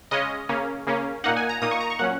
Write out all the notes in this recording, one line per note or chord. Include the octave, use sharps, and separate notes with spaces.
C#3 G#3 C#4 D#5
C#3 A#3 C#4
C#3 A#3 C#4
A#2 A#3 D#4 F#5
G#5
A#5
A#2 A#3 D#4 D#6
C#6
A#5
C#6
A#2 F#3 C#4 F#5